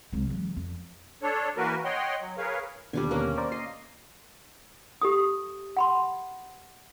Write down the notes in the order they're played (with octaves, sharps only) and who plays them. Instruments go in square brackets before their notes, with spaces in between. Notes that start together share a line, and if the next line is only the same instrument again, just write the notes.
[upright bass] C2 G#3
E2 F#3
F2
[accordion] D4 A4 C#5
E3 A#3 F#4 A#4 B4
C#5 D#5 F#5 G5 C6
F#3
G#4 A#4 B4 C#5 F5
[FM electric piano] D#2 B2 D3 [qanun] G3 D4 G#5
[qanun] A#3 C#4
[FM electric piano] A#4 C5 D5
[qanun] D#5 [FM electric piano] C7
[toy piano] G4 A4 D#6
F#5 B5 C6